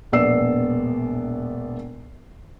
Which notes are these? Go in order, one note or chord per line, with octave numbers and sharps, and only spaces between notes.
E1 A#1 B3 D5 E6 C7